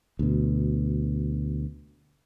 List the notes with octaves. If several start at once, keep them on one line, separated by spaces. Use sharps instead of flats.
D2 B2